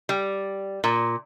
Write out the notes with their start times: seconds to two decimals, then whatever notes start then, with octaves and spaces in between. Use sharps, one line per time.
0.09 G3
0.84 A#2